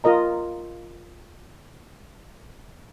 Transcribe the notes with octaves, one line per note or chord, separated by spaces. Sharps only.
F4 A#4 D#5 A#5